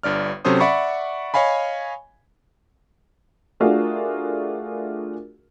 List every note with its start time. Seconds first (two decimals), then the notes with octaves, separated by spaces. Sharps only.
0.03 G1 G2 D5 F6
0.45 C3 F#3 C#4 A4 C5 D#6
0.60 D5 E5 F#5 B5 C#6
1.34 C#5 D#5 F5 G#5 B5
3.60 A3 D4 F4 F#4 G#4 A#4